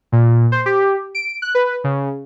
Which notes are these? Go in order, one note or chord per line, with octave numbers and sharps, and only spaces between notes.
A#2
C5
G4
D7
F#6
B4
C#3